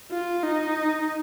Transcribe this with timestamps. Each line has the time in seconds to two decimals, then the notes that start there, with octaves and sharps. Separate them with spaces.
0.11 F4
0.43 D#4